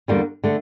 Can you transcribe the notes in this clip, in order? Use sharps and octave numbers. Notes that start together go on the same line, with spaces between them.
E2 D3 G3 A#3
D3 A3